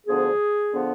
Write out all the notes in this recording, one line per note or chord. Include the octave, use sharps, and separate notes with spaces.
D2 D3 F3 B3 G#4
D3 F3 B3